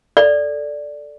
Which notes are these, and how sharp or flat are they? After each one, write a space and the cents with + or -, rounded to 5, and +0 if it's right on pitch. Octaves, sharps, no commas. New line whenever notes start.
A4 +0 D5 +0